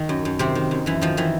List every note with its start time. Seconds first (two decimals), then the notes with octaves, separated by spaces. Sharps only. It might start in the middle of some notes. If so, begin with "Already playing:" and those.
Already playing: D#3 D#4
0.09 F#2
0.25 F#2
0.39 C3 D#3 C4
0.55 D#3
0.71 F#2
0.86 F#2 E3
1.01 D#3 F3
1.17 D#3 E3